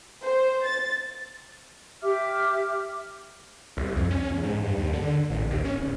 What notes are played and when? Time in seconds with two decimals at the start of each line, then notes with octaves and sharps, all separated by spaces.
0.24 C5
0.66 A6
2.02 G4 E5 D6 F6
3.77 C2
3.96 F2
4.11 C#4
4.31 E2
4.43 G#2
4.62 G2
4.77 D#2
4.93 D3
5.30 A1
5.51 D#2
5.65 C#4
5.78 D1